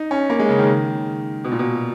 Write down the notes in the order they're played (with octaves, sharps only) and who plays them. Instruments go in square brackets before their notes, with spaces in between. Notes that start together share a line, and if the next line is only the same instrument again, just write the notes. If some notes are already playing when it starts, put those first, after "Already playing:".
Already playing: [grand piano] D#4
C#4
A#3
G#3
C#3
D#3
B2
A#2
B2